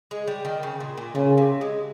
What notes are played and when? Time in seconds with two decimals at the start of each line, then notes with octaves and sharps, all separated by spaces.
0.11 G#3
0.27 G3
0.45 D#3
0.63 C#3
0.80 A#2
0.97 A#2
1.15 A#2 C#3
1.38 C3
1.61 G#3